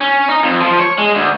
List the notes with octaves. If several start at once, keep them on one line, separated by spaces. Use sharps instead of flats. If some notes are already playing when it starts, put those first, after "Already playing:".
C#4
D#4
F2
F3
C#5
G#3
D2